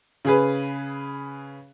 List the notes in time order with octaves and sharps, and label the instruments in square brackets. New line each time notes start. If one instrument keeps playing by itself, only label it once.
[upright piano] C#3 G#4 B4